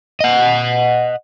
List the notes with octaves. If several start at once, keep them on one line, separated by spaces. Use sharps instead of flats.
D#5 F#5